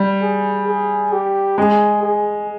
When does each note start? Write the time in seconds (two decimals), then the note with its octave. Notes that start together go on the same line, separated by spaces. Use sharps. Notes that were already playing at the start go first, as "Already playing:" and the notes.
Already playing: G3
0.22 G#4
0.68 G#4
1.12 G4
1.58 G#3 G#4
2.03 G#4